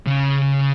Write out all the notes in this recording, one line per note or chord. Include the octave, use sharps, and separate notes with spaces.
C#3